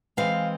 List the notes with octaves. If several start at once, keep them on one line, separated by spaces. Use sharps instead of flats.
E3 G#3 C4 F5